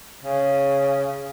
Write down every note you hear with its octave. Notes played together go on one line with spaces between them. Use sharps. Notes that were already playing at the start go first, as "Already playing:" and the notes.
C#3